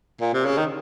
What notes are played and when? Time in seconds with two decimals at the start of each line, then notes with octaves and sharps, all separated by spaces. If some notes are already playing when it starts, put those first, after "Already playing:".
0.21 A#2
0.34 C3
0.46 C#3
0.58 D#3